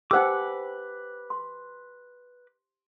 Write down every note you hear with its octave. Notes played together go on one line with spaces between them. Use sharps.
D#4 G4 B4 C5 F#5 D6 E6
C6